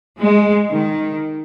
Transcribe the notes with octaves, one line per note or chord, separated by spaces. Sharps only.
G#3
D#3